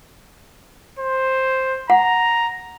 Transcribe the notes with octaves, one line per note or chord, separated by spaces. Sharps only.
C5
F#5 A#5